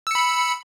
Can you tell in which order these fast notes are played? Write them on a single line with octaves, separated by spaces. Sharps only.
E6 C#7 B5